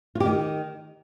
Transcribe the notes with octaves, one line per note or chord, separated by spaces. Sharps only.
F4
G4
D#3